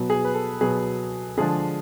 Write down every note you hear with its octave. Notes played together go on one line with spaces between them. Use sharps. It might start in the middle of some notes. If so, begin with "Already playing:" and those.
Already playing: B2 F#3 B3
G#4
B4
A4
B2 F#3 B3 G#4
D3 F3 G#3 D4 G#4